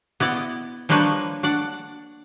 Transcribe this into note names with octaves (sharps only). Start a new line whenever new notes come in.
B3 E4 D5 D#5
F3 G3 A#3 D4 B4 C#5
D4 D5 F#5